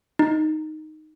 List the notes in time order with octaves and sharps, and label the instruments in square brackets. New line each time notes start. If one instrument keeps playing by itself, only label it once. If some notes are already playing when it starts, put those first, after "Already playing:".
[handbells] D#4